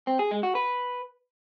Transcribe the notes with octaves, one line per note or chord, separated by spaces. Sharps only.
C4
G#4
G#3
F#4
B4